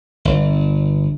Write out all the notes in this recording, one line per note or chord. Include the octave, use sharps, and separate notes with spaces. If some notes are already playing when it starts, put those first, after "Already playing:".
G1